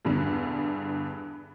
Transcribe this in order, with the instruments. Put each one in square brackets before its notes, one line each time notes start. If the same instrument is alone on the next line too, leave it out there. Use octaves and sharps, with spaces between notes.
[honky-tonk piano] E2 G2 D3